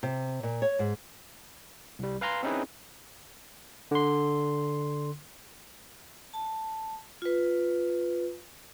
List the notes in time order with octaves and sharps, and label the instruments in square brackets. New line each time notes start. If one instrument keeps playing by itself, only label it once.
[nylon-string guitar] C3
A#2
C#5
G#2
[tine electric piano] C2 G3
B4 F5 G#5 A#5 C6
C4 C#4 D#4 E4 G#4 B4
D3 C6
[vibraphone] A5
F4 B4